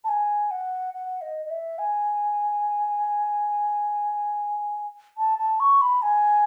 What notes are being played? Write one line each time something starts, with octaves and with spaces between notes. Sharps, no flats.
A5
G#5
F#5
F#5
D#5
D#5
E5
G#5
A5
A5
C#6
B5
G#5